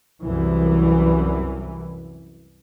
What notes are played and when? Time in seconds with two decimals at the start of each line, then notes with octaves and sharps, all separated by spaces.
0.23 C2 F#2 E3